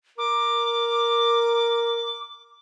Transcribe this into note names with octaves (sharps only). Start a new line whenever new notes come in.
A#4 D6